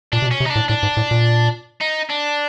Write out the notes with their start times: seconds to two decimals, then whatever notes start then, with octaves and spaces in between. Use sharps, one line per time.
0.13 A#2 D4
0.22 C3
0.26 B2
0.31 C#4
0.40 C3
0.46 D#4
0.50 D4
0.56 A2
0.68 A2 D4
0.83 G#2
0.97 A2
1.11 A#2
1.81 D#4
2.10 D4